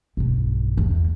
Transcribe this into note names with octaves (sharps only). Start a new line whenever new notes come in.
B1 G2
E2